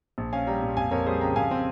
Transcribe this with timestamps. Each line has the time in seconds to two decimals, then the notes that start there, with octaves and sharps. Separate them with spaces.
0.18 A#1
0.33 C#4 F5 G#5
0.47 G3 G5 A#5
0.62 A#2
0.77 F2 F5 G#5
0.91 F2 A#4 C#5
1.06 G3 G#4 C5
1.21 C#3 G5 A#5
1.36 F2 F5 G#5
1.51 C4